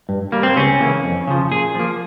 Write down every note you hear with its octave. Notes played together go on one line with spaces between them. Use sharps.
G2
G3 A#3
C4
C#2 C#4
C#3 E3 A#3
F2
C#3 F3
A#2 G#4
F3 A#3